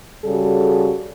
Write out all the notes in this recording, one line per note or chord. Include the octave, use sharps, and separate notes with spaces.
C#3 G3 F#4 G#4 A4